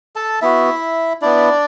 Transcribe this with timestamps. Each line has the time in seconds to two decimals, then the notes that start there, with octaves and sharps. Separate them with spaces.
0.16 A4 A5
0.42 B3 E4 F#4 E5
1.22 B3 D4 E4 D5